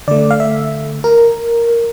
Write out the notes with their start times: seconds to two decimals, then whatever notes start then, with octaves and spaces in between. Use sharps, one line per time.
0.08 D3 A3 D5
0.31 F5
0.40 E5
1.04 A#4